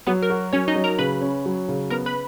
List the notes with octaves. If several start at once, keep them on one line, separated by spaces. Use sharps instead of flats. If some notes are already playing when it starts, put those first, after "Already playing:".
F#3 B3 B4
A#4
F#4
F#3 C#4 C#5
D#4 D#5
F#3
A#4 A#5
C#3 B4 B5
C#4
F#3
C#3
B3 A#4 A#5
B4 B5